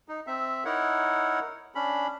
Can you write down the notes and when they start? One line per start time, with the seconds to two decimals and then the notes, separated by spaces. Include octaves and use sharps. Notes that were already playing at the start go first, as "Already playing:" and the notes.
0.08 D#4
0.27 C4 E5
0.65 D#4 E4 A#4 C#5 F#5
1.75 C#4 D4 B5